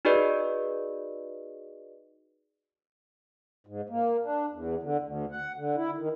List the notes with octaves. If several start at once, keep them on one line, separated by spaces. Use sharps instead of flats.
D#4 F#4 G#4 B4 D5 D#5
G#2
A#3
D4
E2
D3
D2
F#5
D3
E4
D#3